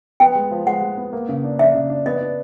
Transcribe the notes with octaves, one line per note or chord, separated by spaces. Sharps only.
B3 G5
G#3
F3
G#3 F#5
G#3
B3
A#3
C#3
D4
D4 E5
C#3
D4
B3 D#5
D4